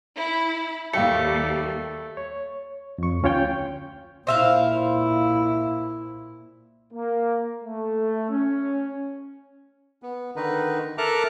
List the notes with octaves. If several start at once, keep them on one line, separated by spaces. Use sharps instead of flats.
E4
D#2 G3 A3 F5 G5 C#7
C#5
F2 C#6
D2 C#4 F4 C#5 G5 G6
A#2 E4 C5 E5 F5
A#3
A3
C#4
B3
D3 D#3 D#4 B4
A4 A#4 E5 A#5 D6 F#6